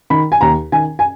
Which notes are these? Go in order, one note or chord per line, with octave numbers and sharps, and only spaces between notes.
D#3 B5
G#5
D#2 A#5
D#3 G#5
G#5